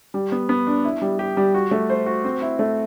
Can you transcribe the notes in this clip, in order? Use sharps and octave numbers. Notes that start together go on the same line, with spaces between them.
G3
B3
B3
D4
E4
G3
G4
G3
F#4
A3
C5
F#4
C4
E4
A3